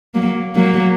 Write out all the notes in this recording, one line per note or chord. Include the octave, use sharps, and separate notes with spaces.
F#3 A#3
F#3 A#3